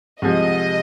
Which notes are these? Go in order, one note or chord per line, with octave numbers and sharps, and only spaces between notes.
C2 C3 F3 G#3 D#5